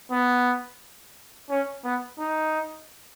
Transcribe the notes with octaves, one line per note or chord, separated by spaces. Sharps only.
B3
C#4
B3
D#4